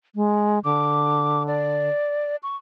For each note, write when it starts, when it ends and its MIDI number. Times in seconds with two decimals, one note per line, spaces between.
0.15 0.59 56
0.64 1.89 50
0.64 1.43 86
1.47 2.36 74
2.43 2.56 85